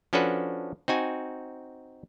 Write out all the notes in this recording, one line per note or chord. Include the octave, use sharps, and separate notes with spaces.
F3 C#4 D4 F#4 A4 B4
C4 D#4 F#4 G#5